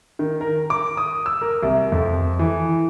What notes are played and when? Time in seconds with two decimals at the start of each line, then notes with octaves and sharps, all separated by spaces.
0.19 D#3
0.41 A#4
0.70 D6
0.97 D#6
1.26 E6
1.41 A#4
1.63 C2
1.92 F2
2.39 E3